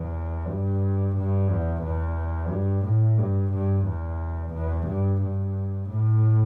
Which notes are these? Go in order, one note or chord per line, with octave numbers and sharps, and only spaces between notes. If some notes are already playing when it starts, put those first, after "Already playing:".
Already playing: E2
G2
G2
E2
E2
G2
A2
G2
G2
E2
E2
G2
G2
A2